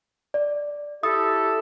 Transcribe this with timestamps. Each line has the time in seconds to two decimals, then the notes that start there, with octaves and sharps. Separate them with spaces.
0.34 D5
1.03 E4 G4 A4 D#6